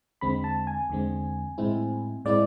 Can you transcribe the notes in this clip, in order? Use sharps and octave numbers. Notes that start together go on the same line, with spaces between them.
E2 D3 G#3 C4 B5
A5
G#5
E2 D3 G#3 C4
A2 G#3 C4 E4
A2 G#3 C4 E4 D5